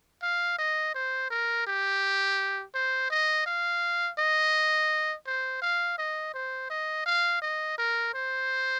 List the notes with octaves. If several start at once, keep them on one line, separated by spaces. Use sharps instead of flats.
F5
D#5
C5
A#4
G4
C5
D#5
F5
D#5
C5
F5
D#5
C5
D#5
F5
D#5
A#4
C5